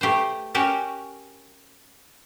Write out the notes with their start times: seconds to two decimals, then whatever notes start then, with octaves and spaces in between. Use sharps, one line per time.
0.01 A3 G4 B4 C5
0.55 C#4 F#4 G4 A#4